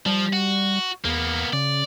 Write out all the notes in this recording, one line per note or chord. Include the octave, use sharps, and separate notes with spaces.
F3 G3
F#4
E2 A#3 B3
C#3 D5